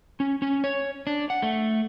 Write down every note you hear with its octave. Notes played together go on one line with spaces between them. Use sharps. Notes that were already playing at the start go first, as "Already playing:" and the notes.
C#4
C#4
C#5
D4
F#5
A3